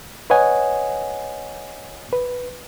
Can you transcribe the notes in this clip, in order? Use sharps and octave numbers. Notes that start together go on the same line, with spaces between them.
B4 C#5 D#5 F#5 G#5
B4